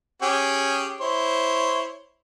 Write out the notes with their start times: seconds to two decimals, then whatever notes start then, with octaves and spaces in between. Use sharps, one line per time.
0.22 C#4 G4 G#4
1.01 E4 C5 C#5